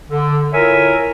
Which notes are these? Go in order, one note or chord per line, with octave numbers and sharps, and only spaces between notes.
D3
E4 F4 A#4 C#5 E5 G#5